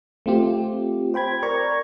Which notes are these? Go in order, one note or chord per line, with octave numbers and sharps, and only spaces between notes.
A3 C4 F4 G4
C5 G5 B5 G#6
A#4 D5 A#5 C#6 G#6